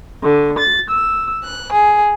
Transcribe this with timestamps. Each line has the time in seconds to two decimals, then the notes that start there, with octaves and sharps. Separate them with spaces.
0.23 D3
0.59 A6
0.90 E6
1.44 F#6
1.73 G#4